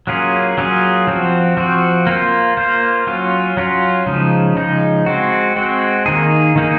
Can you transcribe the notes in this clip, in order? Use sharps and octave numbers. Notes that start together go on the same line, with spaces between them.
F#3 A#3 C#4 F4 G#4
F#3 A#3 C#4 F4 G#4
F3 C4 F#4
F3 C4 F#4
A#3 F4 C5
A#3 F4 C5
F#3 C#4 F4
F#3 C#4 F4
C#3 F3 G#3 D#4
C#3 F3 G#3 D#4
G#3 C4 F#4
G#3 C4 F#4
D#3 A#3 D#4 G#4
D#3 A#3 D#4 G#4